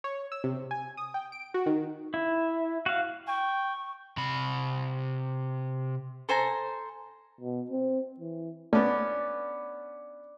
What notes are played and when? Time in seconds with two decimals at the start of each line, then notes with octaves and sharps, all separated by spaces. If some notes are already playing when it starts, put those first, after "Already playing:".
0.04 C#5
0.32 E6
0.44 C3
0.71 G#5
0.97 D#6
1.14 G5
1.32 D7
1.54 F#4
1.66 D#3
2.14 E4
2.86 F#4 F5
3.28 G5 C#6
4.17 C3 B5
6.29 A4 C5 G#5 A#5
7.41 B2
7.70 C4
8.20 E3
8.73 A3 B3 C#4 D5